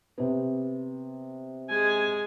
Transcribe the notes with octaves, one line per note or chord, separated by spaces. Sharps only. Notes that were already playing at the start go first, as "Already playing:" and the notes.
C3 B3
G#3 G#5